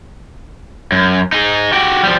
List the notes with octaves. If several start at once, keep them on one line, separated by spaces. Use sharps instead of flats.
F#2
D#4 G#4
F#4 G4
F3 G3